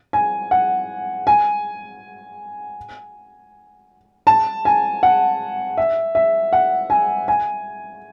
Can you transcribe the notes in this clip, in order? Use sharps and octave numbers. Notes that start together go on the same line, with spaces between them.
G#5
F#5
G#5
A5
G#5
F#5
E5
E5
F#5
G#5
G#5